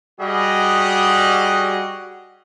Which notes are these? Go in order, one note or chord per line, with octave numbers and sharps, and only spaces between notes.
G3 F#4 G#4 D#5